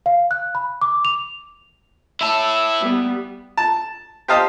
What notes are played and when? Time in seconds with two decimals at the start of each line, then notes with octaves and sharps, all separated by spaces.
0.06 F5
0.31 F#6
0.55 B5
0.82 D6
1.05 F7
2.21 E4 A5 E6
2.80 G3 B3
3.57 A5
4.28 G4 C5 D#5 F5 A5 D#6